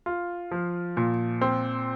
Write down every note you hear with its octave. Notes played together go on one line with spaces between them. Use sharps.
F4
F3
A#2
C4